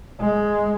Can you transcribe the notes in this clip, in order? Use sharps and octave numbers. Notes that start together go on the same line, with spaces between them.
G#3